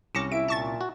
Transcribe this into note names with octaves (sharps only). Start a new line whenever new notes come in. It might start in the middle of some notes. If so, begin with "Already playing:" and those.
C2 C#4 D6 A#6 C#7 E7
E4 E5 D7
A#2 A5 C#6 A6
F#4